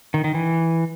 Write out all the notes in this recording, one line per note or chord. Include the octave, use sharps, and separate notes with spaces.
D#3
D#3
E3